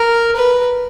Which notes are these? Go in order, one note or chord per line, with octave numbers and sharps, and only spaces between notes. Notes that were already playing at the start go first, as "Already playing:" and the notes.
Already playing: A#4
B4